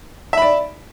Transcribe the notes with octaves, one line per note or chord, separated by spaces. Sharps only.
D5 E5 B5